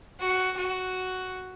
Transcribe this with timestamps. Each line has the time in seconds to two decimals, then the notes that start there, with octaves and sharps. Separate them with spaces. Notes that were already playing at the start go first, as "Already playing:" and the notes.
0.20 F#4
0.58 F#4